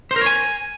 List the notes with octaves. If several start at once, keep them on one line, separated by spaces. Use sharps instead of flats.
C5
A#4
C#5
G#5